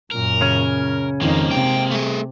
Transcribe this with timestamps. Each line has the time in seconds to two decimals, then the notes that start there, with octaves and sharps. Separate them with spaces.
0.11 F#2 A#2 A#4
0.41 C#3 C#4
1.21 F2 D#3 G#3 A#3 D#4
1.51 C3 G5
1.91 A3 G#4